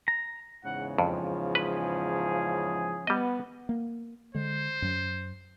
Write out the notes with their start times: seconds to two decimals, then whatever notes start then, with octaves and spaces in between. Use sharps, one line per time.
0.08 A#5
0.65 E2 G#2 C#3 F#5
0.98 F2 F3
1.55 G#4 B4
3.07 G3 B3 D#5
3.69 A#3
4.35 D3 G#3 C5
4.82 F#2 F#3